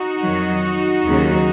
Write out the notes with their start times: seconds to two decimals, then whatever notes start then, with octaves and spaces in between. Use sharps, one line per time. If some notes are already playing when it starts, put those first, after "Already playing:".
Already playing: D#4 F#4
0.24 F2 D#3 F#3
1.05 D#2 C#3 F#3